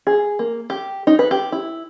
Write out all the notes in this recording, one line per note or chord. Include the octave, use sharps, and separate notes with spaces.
G#4
A#3
G4
D#4
B4
G4
E4